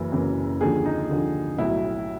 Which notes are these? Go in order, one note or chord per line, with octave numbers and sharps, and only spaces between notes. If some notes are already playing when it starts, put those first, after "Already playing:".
Already playing: F#1 F#2 C#3 E3
F#1 F#2 C#3 E3
D#2 D3 F3 G#4
D#4
D#2 D3 F3
B1 A2 F#3 E4